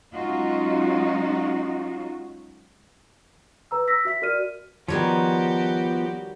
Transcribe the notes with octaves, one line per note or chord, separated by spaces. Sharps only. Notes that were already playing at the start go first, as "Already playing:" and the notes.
F#3 G#3 C#4 D#4 F4 F#4
B4 A#5 E6
E6 A#6 B6
F#4 E5 B6
F#4 A#4 D5 F6 D#7
D#3 F3 G3 B3 F#4 G4 C#5